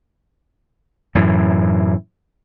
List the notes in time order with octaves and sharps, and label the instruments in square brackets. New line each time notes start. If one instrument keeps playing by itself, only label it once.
[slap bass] F#2 A2 E3